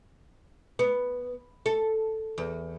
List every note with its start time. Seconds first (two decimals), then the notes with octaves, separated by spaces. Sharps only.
0.79 B3
1.66 A4
2.38 E2